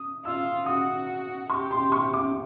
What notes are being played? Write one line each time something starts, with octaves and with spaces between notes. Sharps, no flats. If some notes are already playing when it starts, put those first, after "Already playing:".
Already playing: D#6
F4 E6
F#4 D#6
G4 C#6
C6
C#6
D6